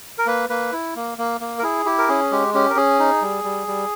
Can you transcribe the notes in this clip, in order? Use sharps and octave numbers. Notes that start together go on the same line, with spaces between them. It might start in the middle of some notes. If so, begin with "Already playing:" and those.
A#4
A#3 B4
A#3 B4
E4
A#3
A#3
A#3
A#4
E4 G#4
E4 G4
A#4
C#4 G#4
G#3 G4
C#4 G4
A#4
C#4 G#4
D#4
G3
G3
G3